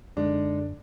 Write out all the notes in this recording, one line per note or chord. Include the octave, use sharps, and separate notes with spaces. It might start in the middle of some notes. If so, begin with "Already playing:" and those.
F#2 D3 G#3 D4 D#4